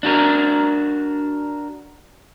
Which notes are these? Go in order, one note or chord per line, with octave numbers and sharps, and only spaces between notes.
D4 F#4 A#4